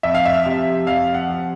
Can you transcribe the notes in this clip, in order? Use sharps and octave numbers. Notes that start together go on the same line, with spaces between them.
F2 E5
F5
E5
C3 F3
F2 F5
F#5
C3 F3